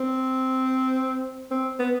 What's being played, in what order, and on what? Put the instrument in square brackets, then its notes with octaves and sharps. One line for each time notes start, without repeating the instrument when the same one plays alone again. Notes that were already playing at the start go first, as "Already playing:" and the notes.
Already playing: [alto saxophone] C4
C4
B3